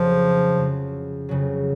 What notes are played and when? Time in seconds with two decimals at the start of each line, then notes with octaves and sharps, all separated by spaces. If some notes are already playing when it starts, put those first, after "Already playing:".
Already playing: F2 C#3 F3 F#3
0.57 F2 C#3 F#3
1.29 F2 C#3 F#3